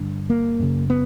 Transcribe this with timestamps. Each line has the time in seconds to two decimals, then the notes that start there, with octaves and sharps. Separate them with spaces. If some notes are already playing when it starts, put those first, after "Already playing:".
Already playing: G2 D3
0.30 A#3
0.60 F#2 C#3
0.90 B3